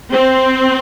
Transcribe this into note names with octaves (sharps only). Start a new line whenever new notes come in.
C4 C5